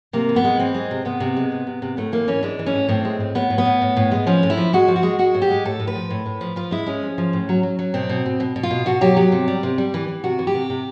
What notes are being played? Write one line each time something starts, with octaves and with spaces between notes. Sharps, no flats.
C3 A#3
E3
B3
G#3
E3 C4
G#3
C3
C3 B3
C3
G#3
C3
C3
C3
A2 A3
E3 A#3
E3 C#4
G#3 D4
E3
C#4
A2
A2 C4
G#3
A2
A2 B3
A2
B3
A2
A2
A2
G#3
F3 C#4
A2
E4
F3
G#3 F#4
F3
F#4
G#3
G#3 F#4
A2
G4
G#3
A2 A4
A2
B4
F3
A2
A2
F3
F3 F4
G#3 E4
G#3 C#4
F3
F3
A2
F#3
F#3
F#3
B2 C4
B2
B2
B2
B2
F4
B2
B2 F#4
F#3 G4
F#3 G4
C3
G3
C3
G3
E3
E3
C3 F#4
E3
G4
C3
C3